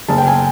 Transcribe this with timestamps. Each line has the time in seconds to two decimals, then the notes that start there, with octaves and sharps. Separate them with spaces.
0.09 F#1 A5
0.18 G5
0.27 G#5